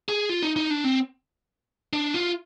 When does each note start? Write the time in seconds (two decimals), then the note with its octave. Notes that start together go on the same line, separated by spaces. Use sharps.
0.09 G#4
0.29 F4
0.43 D#4
0.56 D#4
0.70 D4
0.84 C4
1.93 D4
2.14 F4